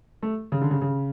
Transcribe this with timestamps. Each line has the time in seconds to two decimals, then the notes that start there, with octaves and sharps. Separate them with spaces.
0.23 A3
0.52 C#3
0.61 D3
0.71 C#3
0.82 C#3